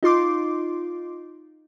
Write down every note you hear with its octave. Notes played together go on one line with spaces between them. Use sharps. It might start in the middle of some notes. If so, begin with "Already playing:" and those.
D#4 F4 C6 D6